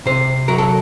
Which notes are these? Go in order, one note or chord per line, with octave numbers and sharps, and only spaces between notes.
C3 C5
F#3 A#4
A4